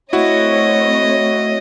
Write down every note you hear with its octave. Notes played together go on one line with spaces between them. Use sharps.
A3 C4 E4 F#4 C#5 D#5